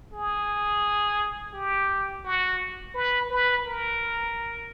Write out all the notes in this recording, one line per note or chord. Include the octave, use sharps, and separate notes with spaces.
G#4
G4
F#4
B4
B4
A#4